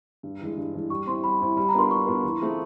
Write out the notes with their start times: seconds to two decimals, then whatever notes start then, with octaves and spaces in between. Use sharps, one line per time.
0.23 G2
0.40 E3 G#3
0.57 G2
0.74 E3 G#3
0.90 G3 C#6
1.07 C4 E4 C6
1.24 G3 B5
1.40 C4 E4
1.57 G3 B5
1.69 A#5
1.74 B3 D4 F4 A#4 C6
1.91 G3 C#6
2.07 B3 D4 F4 A#4
2.23 E3
2.41 A3 C4 F4 G#4